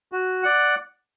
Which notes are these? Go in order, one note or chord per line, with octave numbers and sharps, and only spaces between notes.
F#4
D5 F#5